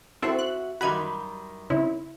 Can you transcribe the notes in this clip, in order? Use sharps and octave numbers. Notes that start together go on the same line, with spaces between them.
C4 E4 F#4 A4 C5 E5
F#6
F#2 D#3 G3 F#4 D#5 F5 B5 G#6
C#3 C4 D#4 E4